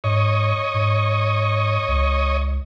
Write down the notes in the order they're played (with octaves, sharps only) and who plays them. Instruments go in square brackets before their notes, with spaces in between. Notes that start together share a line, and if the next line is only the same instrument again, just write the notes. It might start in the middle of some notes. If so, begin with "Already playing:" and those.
[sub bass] G#2 [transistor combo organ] C#5 D#5
[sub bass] G#2
C#2